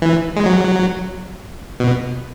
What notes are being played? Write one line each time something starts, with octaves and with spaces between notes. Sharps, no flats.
E3
G#3
F#3
B2